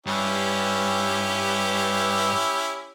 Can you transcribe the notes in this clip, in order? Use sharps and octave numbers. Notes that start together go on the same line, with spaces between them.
G2 C#4 E4 G4